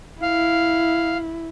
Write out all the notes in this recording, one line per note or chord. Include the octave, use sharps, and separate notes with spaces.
E4 F5